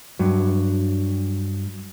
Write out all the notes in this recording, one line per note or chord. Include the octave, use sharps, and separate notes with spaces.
G2 F#3